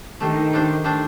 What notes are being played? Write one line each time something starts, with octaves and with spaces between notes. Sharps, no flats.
D#3 A3 D4 G4 C5
A3 D4 G4 C5
A3 D4 G4 C5